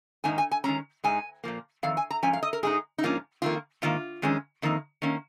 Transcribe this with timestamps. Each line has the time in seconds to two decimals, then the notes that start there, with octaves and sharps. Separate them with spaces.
0.24 G#2 D#3 A#3 D#4 G#5
0.38 G#5
0.51 G#5
0.64 D#3 G#3 C#4 A#5
1.04 G#2 G#3 D#4 G#5
1.44 A#2 F3 A#3
1.83 F2 D#3 F5
1.97 G#5
2.11 A#5
2.23 G#2 F3 C#4 G#5
2.33 F5
2.43 D#5
2.53 A#4
2.63 G#2 G#3 D#4 G#4
2.98 D#4
3.03 G#2 F3 A#3 C#4 F4
3.42 F2 D#3 A#3 F4
3.82 G#2 D#3 A#3 F4
4.22 F2 D#3 G#3 C#4
4.62 F2 D#3 A#3 D#4
5.02 D#3 A#3 C#4